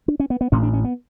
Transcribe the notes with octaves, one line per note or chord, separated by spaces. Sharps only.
D4
C#4
B3
B3
A1 A2 C#4
D4
C#4
B3